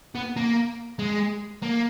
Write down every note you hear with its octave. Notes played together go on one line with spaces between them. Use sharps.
B3
A#3
G#3
A#3